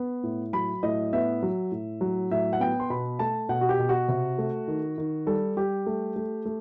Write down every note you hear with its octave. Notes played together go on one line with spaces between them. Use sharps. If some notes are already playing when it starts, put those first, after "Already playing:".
Already playing: B3
A2
F#3 B5
A2 D#5
B3 E5
F#3
A2
F#3
A2 E5
F#5
B3 G5
C6
B2 B5
A3 A5
B2 F#5
F#4
G4
B2
F#4
C3
A3
D#3
D#3
G3 A4
G3 G4
A3
A3
A3